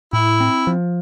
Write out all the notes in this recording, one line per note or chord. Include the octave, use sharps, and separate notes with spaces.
A2 E4
C4
F3